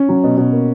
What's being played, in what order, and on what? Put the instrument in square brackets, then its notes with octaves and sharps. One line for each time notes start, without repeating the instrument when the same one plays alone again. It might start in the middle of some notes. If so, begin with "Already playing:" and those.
Already playing: [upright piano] C#4
F#3
B2
B2
A#3